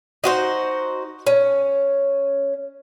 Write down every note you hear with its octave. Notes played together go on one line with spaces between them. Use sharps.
D#4 F#4 C5
C#4